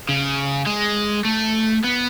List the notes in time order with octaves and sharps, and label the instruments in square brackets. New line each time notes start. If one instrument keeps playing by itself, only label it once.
[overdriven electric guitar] C#3
G#3
A3
B3